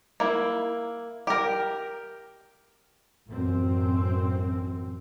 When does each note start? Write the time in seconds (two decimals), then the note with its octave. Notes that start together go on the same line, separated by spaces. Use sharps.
0.20 A#3 E4
1.27 G4 A#4
3.27 A1 F#2 C4